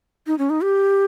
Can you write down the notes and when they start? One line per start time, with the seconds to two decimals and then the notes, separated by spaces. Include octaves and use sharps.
0.27 D#4
0.38 C#4
0.50 D#4
0.62 G4